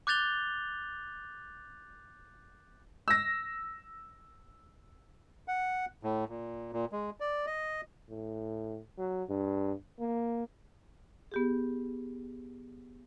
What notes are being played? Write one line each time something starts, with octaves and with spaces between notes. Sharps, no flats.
D6 F#6 G6 A6 F7 G7
E6 A#6
F#5
A2
A#2
A#2
G#3
D5
D#5
A2
F#3
G2
A#3
B3 G4 G#4